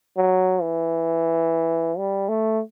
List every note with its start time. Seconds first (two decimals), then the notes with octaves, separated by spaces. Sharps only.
0.17 F#3
0.62 E3
1.98 G3
2.29 A3